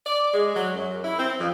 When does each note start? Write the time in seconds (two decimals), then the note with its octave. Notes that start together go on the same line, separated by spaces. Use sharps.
0.04 D5
0.34 G#3
0.54 F#3
0.74 F#2
1.04 E4
1.18 C4
1.38 F2